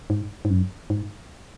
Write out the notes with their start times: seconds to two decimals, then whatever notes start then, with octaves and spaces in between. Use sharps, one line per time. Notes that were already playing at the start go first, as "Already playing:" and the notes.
0.10 G#2
0.45 G#2
0.50 F#2
0.90 G#2